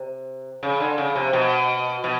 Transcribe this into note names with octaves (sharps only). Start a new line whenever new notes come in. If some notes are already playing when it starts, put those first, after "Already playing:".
Already playing: C3
C#3
D3
C#3
C3
B2
B2